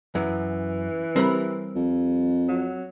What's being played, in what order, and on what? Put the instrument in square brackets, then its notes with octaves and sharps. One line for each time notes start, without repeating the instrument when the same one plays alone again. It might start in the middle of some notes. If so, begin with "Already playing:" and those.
[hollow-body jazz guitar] F#2 [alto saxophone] E3
[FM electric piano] G3 [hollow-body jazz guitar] C4 A#4 B5
[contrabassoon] F2
[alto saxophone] F#3